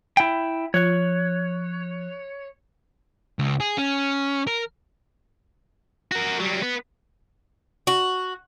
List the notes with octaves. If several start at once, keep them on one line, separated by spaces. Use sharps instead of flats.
E4 G5
F3 C#5 F#6
C#2
G#4
C#4
A#4
F#4 A#4
F#3 G3
B3 B4
F#4